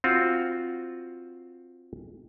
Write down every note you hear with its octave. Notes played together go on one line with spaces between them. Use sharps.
C4 F4 F#4